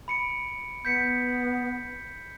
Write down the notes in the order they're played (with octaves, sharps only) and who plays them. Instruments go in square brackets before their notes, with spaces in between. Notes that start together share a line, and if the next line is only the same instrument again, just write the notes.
[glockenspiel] B5 C#7 D7
[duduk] B3 [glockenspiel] G6 B6 C#7